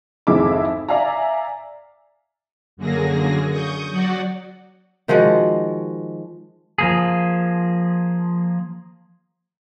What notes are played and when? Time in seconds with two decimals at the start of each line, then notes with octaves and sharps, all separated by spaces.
0.27 G#1 F2 E4 G#4 E5 D6
0.89 D5 E5 F5 G#5 A#5
2.77 F#2 D3 F#3 A#3 G#4 A#6
3.50 C#6 D#6 G6
3.90 F#3 F#4 D5 F#5
5.08 D#3 F3 G#3 F#4
6.78 F3 A#3 G#4